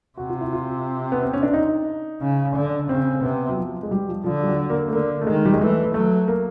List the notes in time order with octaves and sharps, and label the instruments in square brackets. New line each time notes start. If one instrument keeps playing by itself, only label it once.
[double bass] C3 [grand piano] F#4
[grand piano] F4
E4
F4
B3
C4
C#4
D4
D#4
[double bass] C#3
D3
[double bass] C#3 [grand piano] C4
[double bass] C3 [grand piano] B3
[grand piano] F#3
F3
G#3
G3
F3
[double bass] D3 [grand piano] F3
[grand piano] G3
F#3
A#3
A3
[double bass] D3 [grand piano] A#3
[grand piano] A3
[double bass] D#3 [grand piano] G#3
[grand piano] G3
G#3
[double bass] E3 [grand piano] A3
[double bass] F#3 [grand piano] A3
[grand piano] A#3